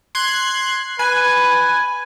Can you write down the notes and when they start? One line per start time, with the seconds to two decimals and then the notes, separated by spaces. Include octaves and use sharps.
0.15 C6 F#6 G#6
0.99 B4 G#5